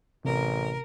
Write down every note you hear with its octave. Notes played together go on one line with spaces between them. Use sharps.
A1 C3 A#4